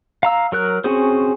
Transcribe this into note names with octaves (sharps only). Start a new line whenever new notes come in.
F5 A#5 E6
F#3 A#4 F#6
C4 C#4 F#4 G#4 C5